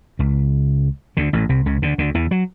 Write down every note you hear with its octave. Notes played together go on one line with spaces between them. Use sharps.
C#2 C#3
D2 D3
A1 A2
C2 C3
C#2 C#3
D2 D3
D2 D3
E2 E3
F#3